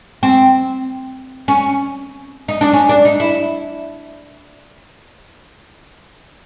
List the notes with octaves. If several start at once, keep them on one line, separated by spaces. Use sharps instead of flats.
C4
C#4
D#4
D4
C#4
D4
D#4
E4